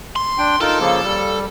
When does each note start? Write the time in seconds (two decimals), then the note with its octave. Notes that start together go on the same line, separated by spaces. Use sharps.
0.16 C6
0.38 D4 G5
0.61 D#4 F4 A4 A#4
0.79 C#3 F3 A#3
1.04 G3